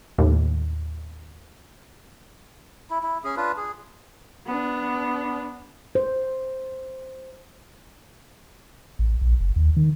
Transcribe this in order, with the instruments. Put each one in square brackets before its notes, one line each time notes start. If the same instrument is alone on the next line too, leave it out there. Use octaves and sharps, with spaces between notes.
[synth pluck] D#2 A2
[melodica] E4
E4
C#4 G#4
D4 F4 B4
G#4
[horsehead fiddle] B3 D4
[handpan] C5
[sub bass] A1
A#1
F#1
D#2
D#3